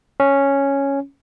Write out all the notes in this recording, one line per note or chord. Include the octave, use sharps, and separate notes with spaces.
C#4